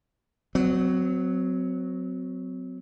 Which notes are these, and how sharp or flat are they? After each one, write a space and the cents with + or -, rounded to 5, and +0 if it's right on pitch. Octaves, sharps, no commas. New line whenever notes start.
F#3 +0 C4 -30